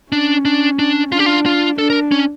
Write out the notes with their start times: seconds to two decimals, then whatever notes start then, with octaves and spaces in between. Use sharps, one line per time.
0.12 C#4 D4
0.45 D4
0.79 D4
1.12 D4 F4
1.19 G4
1.26 F4
1.46 F4
1.78 D4 A4
1.90 A#4
2.12 C#4